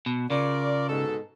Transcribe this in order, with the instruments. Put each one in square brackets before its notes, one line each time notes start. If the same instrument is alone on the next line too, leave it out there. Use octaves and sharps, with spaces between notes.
[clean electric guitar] B2
[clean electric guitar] C#3 [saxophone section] F4 A#4 D5
[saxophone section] G#2 B2 A4